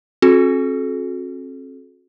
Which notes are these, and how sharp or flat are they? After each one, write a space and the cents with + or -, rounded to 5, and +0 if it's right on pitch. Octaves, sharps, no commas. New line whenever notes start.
C4 +40 F#4 -30 A4 -35